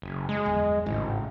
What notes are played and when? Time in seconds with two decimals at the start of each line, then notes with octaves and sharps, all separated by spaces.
0.02 F#1
0.29 G#3
0.45 D1 G1 E2
0.86 G#1 C#2 A2